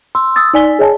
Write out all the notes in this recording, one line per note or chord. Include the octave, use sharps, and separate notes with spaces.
C6 E6
D#6 E6 A6
D#4 D5 G#5 B6 G7
G#4 C#5 D#5 G#5 A5